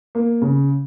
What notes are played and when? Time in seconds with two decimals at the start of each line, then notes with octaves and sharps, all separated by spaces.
0.15 A#3
0.42 C#3